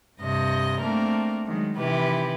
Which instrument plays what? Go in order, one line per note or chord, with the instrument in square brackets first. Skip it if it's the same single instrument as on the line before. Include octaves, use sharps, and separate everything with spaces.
[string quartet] G2 C3 D#5 A#6
A3 A#3 C4 D4 A#4
D#3 F#3 G#3
C3 D#3 E3 E4 G4 B4